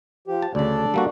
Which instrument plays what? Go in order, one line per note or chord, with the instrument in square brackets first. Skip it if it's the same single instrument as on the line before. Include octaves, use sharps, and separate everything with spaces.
[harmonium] F3 G4
[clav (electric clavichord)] A5
[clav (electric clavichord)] D2 C#3 [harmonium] D4 A4 D5
[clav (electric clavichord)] G3 A#3 F#4